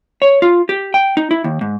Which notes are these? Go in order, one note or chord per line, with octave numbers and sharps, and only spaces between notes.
C#5
F4
G4
G5
D#4
E4
D#2
G#2